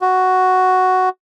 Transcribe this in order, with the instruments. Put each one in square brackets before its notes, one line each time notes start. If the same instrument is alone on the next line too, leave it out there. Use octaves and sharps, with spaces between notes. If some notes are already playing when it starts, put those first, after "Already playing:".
[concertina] F#4